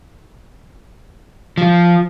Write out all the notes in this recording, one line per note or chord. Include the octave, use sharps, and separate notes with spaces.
F3